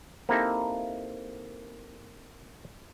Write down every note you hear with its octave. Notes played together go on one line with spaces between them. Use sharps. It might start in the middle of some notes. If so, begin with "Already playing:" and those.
A#3 C4 D#4 E4 G4 A4